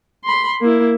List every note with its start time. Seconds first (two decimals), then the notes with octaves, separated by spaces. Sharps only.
0.24 B5 C6
0.61 A#3 E4